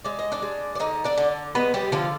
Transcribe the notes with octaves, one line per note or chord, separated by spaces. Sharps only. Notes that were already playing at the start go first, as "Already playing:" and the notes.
G#3 D5
D#5
D4 D5
G#3
D5
D3 D#4 D#5
D4 D5
D3
G#3 B3 B4
G3 G4
D3 F3 F4